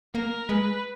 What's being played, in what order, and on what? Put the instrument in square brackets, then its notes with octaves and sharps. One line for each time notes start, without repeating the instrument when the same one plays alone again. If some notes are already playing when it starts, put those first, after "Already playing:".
[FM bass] A#3 [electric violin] A#4
[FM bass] G#3 [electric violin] B4